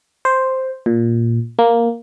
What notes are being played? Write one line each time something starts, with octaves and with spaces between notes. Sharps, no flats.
C5
A#2
A#3